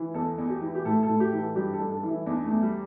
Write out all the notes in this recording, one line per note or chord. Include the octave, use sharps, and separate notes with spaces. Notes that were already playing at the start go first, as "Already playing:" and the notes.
Already playing: E3
E2 A4
E2
G4
E3
G4
A2 A4
A4
A2
G4
E3
A4
G2 G4
A4
G2
A4
E3
E4
E2 D4
A3
E2
G3